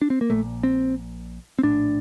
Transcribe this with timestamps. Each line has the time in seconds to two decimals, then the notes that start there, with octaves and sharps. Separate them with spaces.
0.02 D4
0.10 C4
0.21 A#3
0.30 A#1 A#2 A3
0.63 C4
1.59 C4
1.63 A#1 A2 D4